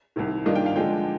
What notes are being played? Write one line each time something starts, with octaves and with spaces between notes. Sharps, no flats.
C2 C3 D#3
G2 D#3 A#3 D4 F4 D#5
G5
F5
D3 F3 G#3 G5